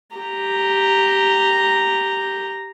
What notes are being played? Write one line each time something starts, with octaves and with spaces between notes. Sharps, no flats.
G4 A#5